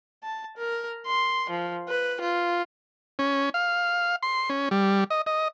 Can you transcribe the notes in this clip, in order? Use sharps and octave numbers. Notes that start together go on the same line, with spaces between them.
A5
A#4
C6
F3
B4
F4
C#4
F5
C6
C#4
G3
D#5
D#5